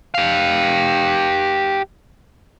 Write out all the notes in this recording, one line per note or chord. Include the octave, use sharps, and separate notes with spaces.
G4 F5